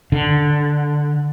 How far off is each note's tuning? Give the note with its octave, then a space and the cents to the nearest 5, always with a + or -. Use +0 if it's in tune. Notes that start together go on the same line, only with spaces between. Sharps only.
D3 +0